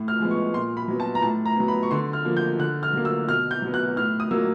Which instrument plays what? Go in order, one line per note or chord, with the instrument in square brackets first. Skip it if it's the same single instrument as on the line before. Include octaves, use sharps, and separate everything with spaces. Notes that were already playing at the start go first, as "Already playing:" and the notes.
Already playing: [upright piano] A2
F6
F3 G#3 B3
C#6
A#2 C6
B5
F#3 B3
A5
A#5
A2 A5
A#5
F#3 B3
B5
C#6
D3 C6
F6
F3 A#3
G6
D3 F#6
F6
F#3 A#3
E6
B2 F6
G6
F#3 B3
F#6
A2 F6
D#6
F#3 A#3 E6